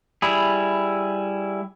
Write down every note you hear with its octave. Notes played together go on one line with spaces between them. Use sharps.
G3 E4 G#4